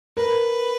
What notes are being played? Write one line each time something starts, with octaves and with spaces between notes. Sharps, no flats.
A#4 B4